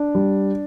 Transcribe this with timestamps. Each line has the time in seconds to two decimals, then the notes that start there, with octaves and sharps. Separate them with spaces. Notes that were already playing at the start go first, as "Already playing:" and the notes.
Already playing: D4
0.15 G3